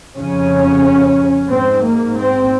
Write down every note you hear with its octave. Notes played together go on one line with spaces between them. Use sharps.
F2 C#3 C#4
G#2 C4
A#3
C4